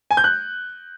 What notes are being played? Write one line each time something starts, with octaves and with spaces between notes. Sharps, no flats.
G#5
G6
F#6